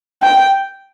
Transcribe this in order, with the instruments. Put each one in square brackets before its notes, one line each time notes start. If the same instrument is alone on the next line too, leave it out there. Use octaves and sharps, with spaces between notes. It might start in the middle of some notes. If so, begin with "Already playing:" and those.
[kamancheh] G5